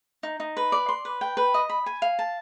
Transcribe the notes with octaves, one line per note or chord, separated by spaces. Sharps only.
D#4
D#4
B4
D5
C6
B4
G5
B4
D#5
B5
G#5
F5
A5